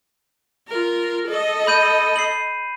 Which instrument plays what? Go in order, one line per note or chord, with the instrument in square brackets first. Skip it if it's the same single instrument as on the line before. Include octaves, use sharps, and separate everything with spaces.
[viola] F4 A#4
A4 D#5
[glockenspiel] B5 G6 D#7
C7 F#7